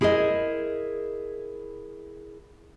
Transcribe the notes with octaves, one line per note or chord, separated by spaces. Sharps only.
E4 G#4 A#4 C5 D#5